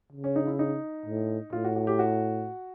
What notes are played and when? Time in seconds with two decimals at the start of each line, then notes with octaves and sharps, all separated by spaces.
0.13 C#3
0.24 C#4
0.36 D#4
0.47 E4
0.59 D#4
1.06 A2
1.53 A2 F4
1.64 F#4
1.76 F#4
1.87 G4
1.99 F#4